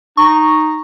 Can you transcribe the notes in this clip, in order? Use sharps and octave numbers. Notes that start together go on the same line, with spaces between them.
D#4 C#6